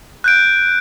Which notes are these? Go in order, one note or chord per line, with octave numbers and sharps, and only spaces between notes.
F#6 G6 D7